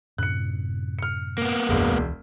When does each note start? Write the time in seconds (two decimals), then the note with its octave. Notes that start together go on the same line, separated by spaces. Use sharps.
0.18 F#2 A2 C3 F#6 C#7
0.99 F6 C#7
1.38 A#3 B3
1.69 E1 A#1 F#2 G#3
1.89 C#2 E3